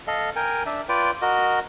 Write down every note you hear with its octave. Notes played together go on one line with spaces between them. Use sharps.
A4 D#5 F5
A#4 G5 G#5
D4 E5
F4 B4 D5 G5
F#4 A#4 D#5